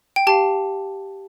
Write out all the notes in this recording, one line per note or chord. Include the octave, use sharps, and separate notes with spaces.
G5
G4 F5 A5